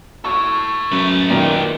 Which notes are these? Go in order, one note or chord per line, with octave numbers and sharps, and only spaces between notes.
A4 C#5 C#6
F#2 A3 B4
A#2 D#3 D#4 G4